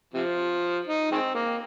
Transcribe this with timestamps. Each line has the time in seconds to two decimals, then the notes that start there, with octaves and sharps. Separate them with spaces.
0.14 C3 F3
0.87 D#4
1.11 D#3 G#3 C4
1.35 A#3